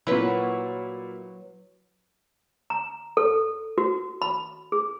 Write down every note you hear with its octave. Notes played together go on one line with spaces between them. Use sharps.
A#2 F#3 E4 B4
A#5
A4
F#4
B5
G#4